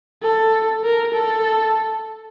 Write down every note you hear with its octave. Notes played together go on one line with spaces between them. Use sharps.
A4
A#4
A4